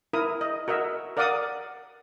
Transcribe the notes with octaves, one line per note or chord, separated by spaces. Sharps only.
E4 A#4 D#6
D#5
F#4 A#4 D#5 E5
A#4 D5 F5 F#5 D6 D#6